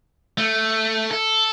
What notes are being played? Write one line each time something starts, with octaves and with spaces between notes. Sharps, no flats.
A3
A4